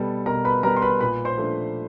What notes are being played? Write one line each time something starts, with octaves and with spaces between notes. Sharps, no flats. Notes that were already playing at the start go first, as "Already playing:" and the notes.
Already playing: B2 G3 B3 A4 A5
B2 A#4 A#5
B4 B5
G3 B3 A#4 A#5
C6
B4 B5
A#2 B4 B5
C5 C6
F3 A3 D4